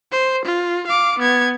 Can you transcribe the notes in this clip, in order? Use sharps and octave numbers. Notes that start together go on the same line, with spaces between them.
C5
F4
F5 D6
B3 G#6